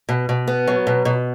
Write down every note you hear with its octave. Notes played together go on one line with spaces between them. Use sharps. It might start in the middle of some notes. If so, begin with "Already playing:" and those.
B2
B2
B3
F#3
B2
B2